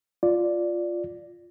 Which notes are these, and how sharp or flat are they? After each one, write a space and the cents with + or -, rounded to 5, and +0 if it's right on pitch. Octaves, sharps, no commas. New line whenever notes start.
F4 +0 D5 +0